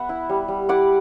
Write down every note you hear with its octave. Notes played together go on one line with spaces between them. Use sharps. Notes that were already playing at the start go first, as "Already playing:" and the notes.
Already playing: B3 E5 F#5
E4
G3
G3
E4 D5 F#5